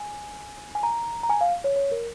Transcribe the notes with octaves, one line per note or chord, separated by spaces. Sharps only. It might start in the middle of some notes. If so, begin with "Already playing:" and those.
Already playing: G#5
G#5
A#5
A#5
G#5
F5
C#5
C#5
A#4